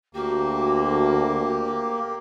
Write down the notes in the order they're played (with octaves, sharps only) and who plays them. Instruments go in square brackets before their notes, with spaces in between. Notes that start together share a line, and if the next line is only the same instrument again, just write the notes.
[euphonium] D2 [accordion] A#3 [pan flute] F#4 [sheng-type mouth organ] G4